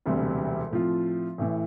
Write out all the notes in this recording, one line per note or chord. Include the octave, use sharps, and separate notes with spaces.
E1 D2 C3 G3
A2 F3 C4 F4
A1 A2 E3